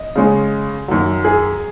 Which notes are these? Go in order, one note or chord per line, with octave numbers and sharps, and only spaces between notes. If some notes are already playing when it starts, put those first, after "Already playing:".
Already playing: D#5
C#3 G#3 C#4
F#2 D#3 F#3
G#4